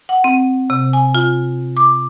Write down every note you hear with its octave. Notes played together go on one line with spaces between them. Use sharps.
F#5
C4
C3
G#5
F4
D6